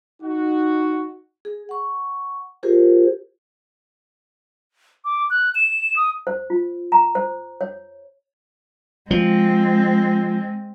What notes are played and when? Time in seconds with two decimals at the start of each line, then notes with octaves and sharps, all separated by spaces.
0.23 D#4 F#4
1.45 G#4
1.69 F#5 C#6
2.63 F4 G4 G#4 A#4 C5
5.05 D6
5.30 F#6
5.55 E7
5.96 D#6
6.27 C5
6.50 F4
6.92 A#5
7.15 C5
7.61 C#5
9.11 F3 G#3 C4